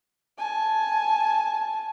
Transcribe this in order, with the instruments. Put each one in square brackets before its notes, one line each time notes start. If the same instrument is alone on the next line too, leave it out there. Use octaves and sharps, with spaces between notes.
[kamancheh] G#5 A5